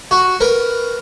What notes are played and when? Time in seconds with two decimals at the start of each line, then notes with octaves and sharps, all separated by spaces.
0.11 F#4
0.41 A#4 B4